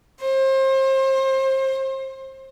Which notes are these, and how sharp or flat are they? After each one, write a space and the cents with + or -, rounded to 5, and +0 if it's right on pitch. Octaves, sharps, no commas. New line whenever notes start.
C5 +30